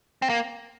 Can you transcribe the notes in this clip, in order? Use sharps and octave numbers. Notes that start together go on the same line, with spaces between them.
C4
A#3